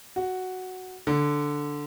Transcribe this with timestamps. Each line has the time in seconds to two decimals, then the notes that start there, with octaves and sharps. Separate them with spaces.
0.16 F#4
1.07 D3